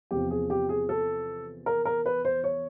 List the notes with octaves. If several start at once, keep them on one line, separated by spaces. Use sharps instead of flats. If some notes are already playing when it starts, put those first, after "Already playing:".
E2 C3 F3 G4
G#4
G4
G#4
A4
A#4
A#4
B4
C5
C#5